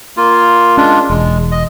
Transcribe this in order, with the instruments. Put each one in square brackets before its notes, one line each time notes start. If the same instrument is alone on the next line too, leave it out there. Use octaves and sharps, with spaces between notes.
[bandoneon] A#3 F4
[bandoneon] G#3 D4 F4 [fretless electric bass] C#4
[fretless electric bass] E1 [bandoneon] G#3
[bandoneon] D#5